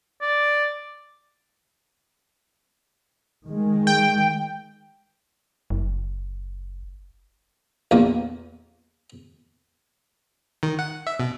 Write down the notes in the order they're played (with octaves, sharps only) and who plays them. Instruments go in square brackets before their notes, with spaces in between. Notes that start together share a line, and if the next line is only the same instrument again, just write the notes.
[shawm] D5
[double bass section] D#3 G#3
[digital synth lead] G5
[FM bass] F#1
[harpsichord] A#1 E2 A#3
[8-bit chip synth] D#3
F#5
E5
B2